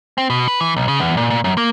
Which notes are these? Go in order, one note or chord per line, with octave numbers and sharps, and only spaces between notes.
C4
B2
B4
E3
B1
C#3
E2
A#2
A#2
F#2
A#3